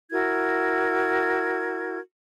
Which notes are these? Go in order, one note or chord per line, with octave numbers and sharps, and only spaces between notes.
E4 F#4 A#4 G#6